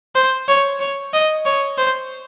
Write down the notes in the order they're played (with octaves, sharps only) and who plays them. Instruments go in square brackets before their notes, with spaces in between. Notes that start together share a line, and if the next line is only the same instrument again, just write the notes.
[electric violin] C5
C#5
C#5
D#5
C#5
C5